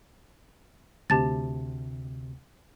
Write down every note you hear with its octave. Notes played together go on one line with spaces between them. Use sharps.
D2 C3 G4 A5 A6